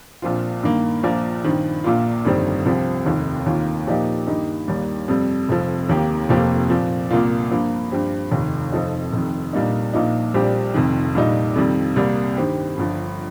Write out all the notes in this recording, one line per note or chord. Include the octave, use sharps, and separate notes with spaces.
A#1 A#2 F3 C4 F4
G2 D#3 A#3
A#1 A#2 F3 A#3
G2 D#3 C4
A#1 A#2 A#3 F4
G1 F2 D#3 G3 C4
C2 C3 F3 C4 G4
F1 D#2 D#3
D#2 D#3 A#3 F4
A#2 F3 A#3 D#4 G4
G2 D#3 A#3 D#4 G4
D#2 D#3 G3 A#3
F2 C3 G3
F1 F2 F3
D#2 D#3 A#3 G4
F1 F2 F3 A#3 G4
A#2 F3 C4
C2 A#2 A#3 F4
G2 F3 A#3
G2 F3 C4 G4
F1 D#2 D#3
F1 F2 F3 D#4
F1 F2 C3 D#3
A#1 A#2 G3 A#3 D#4
A#1 A#2 F3 A#3 D#4
A#1 A#2 G3 C4 G4
F1 F2 D#3
A#1 A#2 G3 D#4
F2 C3 D#3 G3
C2 C3 G3 A#3
G2 D#3 C4 G4
G1 G2 F3